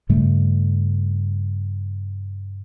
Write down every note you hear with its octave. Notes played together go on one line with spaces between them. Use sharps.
G2 C#3 G3 A3